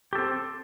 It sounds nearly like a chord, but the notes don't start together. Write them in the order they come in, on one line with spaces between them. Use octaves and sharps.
G4 A4 C4